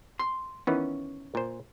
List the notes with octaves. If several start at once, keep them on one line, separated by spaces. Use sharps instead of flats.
C6
D#3 E3 B3 C#4
A#2 C5